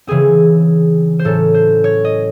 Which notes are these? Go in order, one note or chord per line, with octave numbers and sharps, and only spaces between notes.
C#3 E3 C4 G#4
C5
A2 F#3 C#4 A4
C5
C#5
D#5